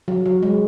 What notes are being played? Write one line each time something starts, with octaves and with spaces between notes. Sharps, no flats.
F#3
F#3
G#3